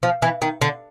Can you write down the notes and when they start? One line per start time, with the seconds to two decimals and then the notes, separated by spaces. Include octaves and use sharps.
0.03 F3
0.22 E3
0.42 D#3
0.62 D3